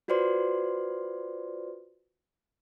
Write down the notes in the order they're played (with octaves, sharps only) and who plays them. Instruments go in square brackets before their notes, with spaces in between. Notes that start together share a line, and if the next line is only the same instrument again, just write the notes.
[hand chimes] F4 F#4 B4 C5 D5 C6